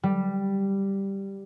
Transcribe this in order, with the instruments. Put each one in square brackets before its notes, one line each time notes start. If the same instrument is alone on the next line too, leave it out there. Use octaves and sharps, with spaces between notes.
[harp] G3